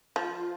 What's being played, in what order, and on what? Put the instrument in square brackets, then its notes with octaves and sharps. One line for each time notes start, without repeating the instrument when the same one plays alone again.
[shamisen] F3 [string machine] F4